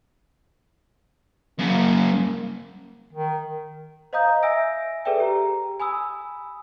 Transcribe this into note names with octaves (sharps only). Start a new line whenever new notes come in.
F#2 C#3 A#3
D#3
C5 D#5 F5 A#5 D#6 G6
E5 G#5 E6 A#6 D7
G#4 A4 B4 D5 E5 G5
G4 A#5
G#5 B5 D#6 E6